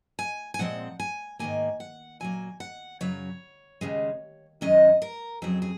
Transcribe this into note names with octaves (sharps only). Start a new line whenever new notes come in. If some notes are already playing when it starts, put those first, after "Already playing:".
G#5
G#5
A#2 F3 G#3 C4 F#5
G#5
G#2 D#3 A#3 G#5
F#5
A#2 F#3 A#3 G#5
F#5
F#2 C#3 F#3 C#5
D#2 C#3 G#3
F#2 D#3 G#3 C#4 D#5
A#4
F2 C#3 F#3 G#4
G#4